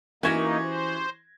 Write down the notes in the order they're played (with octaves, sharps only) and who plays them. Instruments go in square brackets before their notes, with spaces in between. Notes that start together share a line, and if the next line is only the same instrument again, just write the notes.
[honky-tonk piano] E3 G#6 A#6 [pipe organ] A#3 D#4 [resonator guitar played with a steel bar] C#4 F#4 G4
[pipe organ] C5